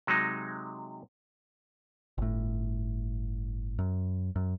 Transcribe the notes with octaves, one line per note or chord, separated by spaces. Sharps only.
C3 F#3 G#3 D#4
G1 A2
F#2
F#2